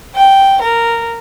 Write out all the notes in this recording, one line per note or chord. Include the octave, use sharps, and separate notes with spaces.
G5
A#4